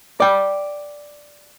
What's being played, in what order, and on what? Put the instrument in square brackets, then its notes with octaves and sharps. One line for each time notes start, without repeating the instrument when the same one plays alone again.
[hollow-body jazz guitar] D5 G5